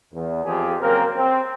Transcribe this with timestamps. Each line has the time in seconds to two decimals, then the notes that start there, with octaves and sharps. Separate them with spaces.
0.14 E2
0.45 F2 F3 G4 G#4
0.80 C#3 F#3 A#3 C4 A#4
1.16 C4